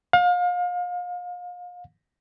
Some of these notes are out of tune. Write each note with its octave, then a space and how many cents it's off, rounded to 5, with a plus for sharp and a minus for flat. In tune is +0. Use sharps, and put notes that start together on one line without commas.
F5 +35